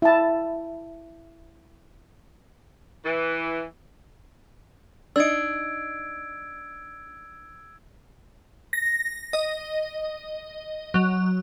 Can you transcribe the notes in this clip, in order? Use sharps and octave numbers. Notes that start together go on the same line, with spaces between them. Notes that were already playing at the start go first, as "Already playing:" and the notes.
E4 A5
E3
D4 D#4 E6 G#6 D7
A#6
D#5
F#3